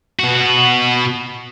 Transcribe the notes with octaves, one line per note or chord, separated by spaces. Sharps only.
B2 F#4